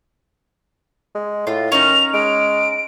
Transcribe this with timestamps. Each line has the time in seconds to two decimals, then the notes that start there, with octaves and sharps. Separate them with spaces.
1.15 G#3
1.47 A2 F4
1.72 D#3 C#4 D#4 F7
2.14 G#3 D7